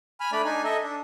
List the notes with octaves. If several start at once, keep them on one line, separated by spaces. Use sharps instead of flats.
G#5 B5 F6
A3 D4 D5 B5
D4 D#4 G#5
A4 D#5 E5
D4